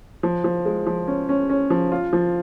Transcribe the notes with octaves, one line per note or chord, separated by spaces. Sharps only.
F3
F3
G#3
F3
C#4
C#4
C#4
F3
F4
F3